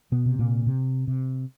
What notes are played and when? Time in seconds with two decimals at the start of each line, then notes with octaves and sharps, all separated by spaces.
0.12 B2 B3
0.26 C3
0.39 A#2 A#3
0.67 C3
1.07 C3